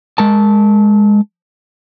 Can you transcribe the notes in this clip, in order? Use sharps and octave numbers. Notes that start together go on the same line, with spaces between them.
G#3 A#4 A5